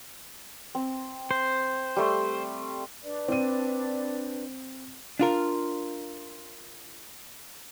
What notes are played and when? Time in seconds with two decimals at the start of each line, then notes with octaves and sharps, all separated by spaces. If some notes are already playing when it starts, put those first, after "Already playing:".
0.75 C4
1.31 C5
1.96 G3 A3 C6
3.03 D4 B4 D5
3.28 C4 D#7
5.19 D4 F4 A#4